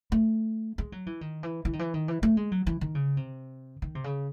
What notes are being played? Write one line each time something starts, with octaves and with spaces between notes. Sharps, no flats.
A3
G#3
F#3
E3
D#3
E3
E3
D#3
E3
D#3
E3
A3
G#3
F#3
E3
D#3
C#3
C3
D#3
C3
C#3